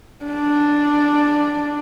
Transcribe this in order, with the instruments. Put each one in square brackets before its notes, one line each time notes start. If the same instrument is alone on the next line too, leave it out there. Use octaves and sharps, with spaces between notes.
[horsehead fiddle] D4